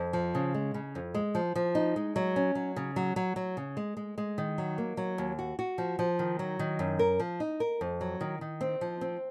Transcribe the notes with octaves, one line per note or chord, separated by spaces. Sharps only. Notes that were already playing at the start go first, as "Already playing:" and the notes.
Already playing: F2
F3
C#3
G#3
C#3
F2
G#3
F3
F3
D#4
G#3
F#3
C#4
F#3
C#3
F#3
F#3
F#3
C#3
G#3
G#3
G#3
D#3
F#3
A#3
F#3
D#2
F#4
F#4
F3
F3
D#3
F#3
D#3
F#2
A#4
F3
D#4
A#4
F2
F#3
D#3
D#3
C4
F3
C4